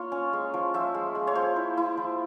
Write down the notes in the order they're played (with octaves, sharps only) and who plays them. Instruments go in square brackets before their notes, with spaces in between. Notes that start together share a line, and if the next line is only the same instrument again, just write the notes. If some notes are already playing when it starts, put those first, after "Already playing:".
Already playing: [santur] A#3 F4 C#5
C#4
G#3
F3
F3 E5
G#3
G#3
C#5
F3 C5
E4
E4
F3